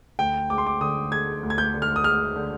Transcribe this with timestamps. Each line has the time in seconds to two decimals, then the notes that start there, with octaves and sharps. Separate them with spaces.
0.19 D2 G5
0.50 G#3 D6
0.58 C6
0.67 D6
0.81 D3 D#6
1.12 G#3 G#6
1.43 D2
1.50 G#6
1.58 G6
1.74 D3
1.82 F6
1.96 D#6
2.04 G#3 F6
2.36 D3